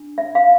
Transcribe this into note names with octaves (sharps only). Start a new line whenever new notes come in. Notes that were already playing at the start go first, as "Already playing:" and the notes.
Already playing: D4
E5
F5